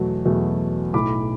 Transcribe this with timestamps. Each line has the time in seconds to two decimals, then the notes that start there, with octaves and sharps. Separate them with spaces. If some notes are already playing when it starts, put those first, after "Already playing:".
Already playing: E2 B2 F#3 A3
0.25 E2 B2 F#3 A3
0.94 B1 A2 E3 B5 D6